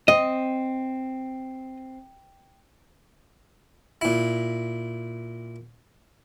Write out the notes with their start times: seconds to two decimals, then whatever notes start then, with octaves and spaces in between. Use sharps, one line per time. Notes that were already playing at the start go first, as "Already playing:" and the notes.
0.08 C4 D#5
4.01 A#2 E4